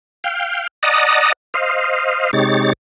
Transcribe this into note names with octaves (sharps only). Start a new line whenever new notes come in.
F5 G5
D5 D#5 F#5 A5 A#5 D#6
C5 D#5 F5
C3 G#3 D#4 G4 C#5 A6